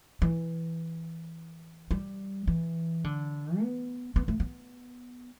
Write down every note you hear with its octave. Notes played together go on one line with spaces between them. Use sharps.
E3
G3
E3
D3
B3
B3
A3
B3